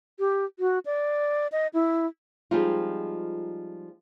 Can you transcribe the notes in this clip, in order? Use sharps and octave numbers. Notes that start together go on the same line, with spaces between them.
G4
F#4
D5
D#5
E4
F3 G3 G#3 C4 D#4 F4